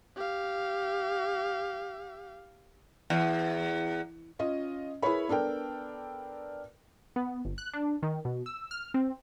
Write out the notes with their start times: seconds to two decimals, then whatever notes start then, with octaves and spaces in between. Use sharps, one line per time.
0.16 G4 F5
3.10 E2
4.39 C#4 F4 D#5
5.03 E4 G#4 A#4 B4 C#5 B5
5.28 B3 D4 A4 A#4 G5
7.16 B3
7.45 G1
7.58 F#6
7.73 D4
8.03 D#3
8.25 B2
8.46 E6
8.71 F6
8.94 C4